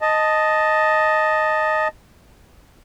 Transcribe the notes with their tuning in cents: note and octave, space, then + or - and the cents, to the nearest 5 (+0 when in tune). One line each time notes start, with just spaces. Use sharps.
D#5 +0 A5 +0